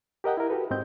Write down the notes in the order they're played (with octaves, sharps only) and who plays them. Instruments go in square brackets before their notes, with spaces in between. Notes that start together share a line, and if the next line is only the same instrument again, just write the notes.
[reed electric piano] G4 A#4 D#5 F#5 G5
E4 A#4
F#4 G4 A4 B4
G#2 C4 D#5 G6